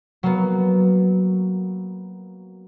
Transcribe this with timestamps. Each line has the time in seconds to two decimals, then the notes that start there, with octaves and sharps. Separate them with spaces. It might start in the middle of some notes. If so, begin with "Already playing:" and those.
0.23 F#3 A#3 B3